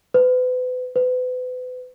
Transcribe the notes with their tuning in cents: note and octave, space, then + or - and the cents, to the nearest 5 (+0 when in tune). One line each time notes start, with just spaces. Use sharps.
B4 +35
B4 +35